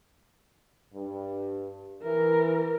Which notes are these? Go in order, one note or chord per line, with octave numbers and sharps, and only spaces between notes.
G2
E3 A#4